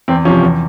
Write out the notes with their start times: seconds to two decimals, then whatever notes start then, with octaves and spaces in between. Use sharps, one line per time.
0.08 E2 C4
0.25 C3 F3 C#4
0.43 E2